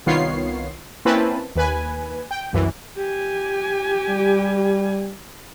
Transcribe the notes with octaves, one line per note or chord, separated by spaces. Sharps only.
C2 D#3 B3 F4 C#5 C7
A#3 C4 C#4 E4 B4 A5
D#2 B4 G#5
G5
C2 F#2 E3
G4 G#5
G3